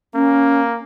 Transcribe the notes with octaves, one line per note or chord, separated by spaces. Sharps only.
A#3 C#4